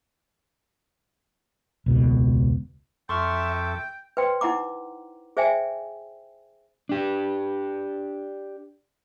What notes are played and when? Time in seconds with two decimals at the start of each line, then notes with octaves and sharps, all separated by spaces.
1.86 E1 C#2 B2
3.09 F2 A4 E5 G5 C6 C#6 F6
4.17 B4 C5 D5 G5 C6
4.41 D#4 E4 F#5 A#5 D6
5.37 G#4 C5 D5 E5 G5 G#5
6.89 D4 G4